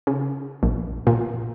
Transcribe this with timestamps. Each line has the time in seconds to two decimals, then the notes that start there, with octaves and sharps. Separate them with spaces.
0.07 C#3
0.63 A#1
1.07 A#2